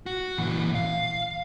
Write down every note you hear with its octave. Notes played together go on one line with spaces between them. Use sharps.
F#4
A#2 E3
F5